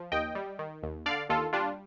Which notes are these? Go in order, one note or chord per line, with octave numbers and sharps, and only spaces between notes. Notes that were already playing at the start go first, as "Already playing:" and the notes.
Already playing: F3
D#2 D#5 G5
G3
D#3
D#2
D3 D5 F5
D#2 F4 A4
G3 D4 F4